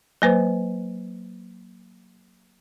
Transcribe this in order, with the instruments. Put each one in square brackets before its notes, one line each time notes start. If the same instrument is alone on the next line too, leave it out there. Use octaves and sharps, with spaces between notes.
[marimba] F#3 A#3 B4 C5